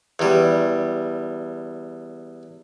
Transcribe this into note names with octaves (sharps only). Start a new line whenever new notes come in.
E2 G3